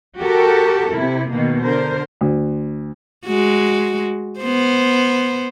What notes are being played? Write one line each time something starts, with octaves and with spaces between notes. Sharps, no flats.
F#4 G4 A4 A#4
C3 E4
B2 D#3 A#3
D3 A#4 C5
D2
G#3 F#4
B3 C5